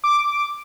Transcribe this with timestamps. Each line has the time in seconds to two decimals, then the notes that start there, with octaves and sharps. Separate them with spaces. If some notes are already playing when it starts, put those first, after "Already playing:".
0.04 D6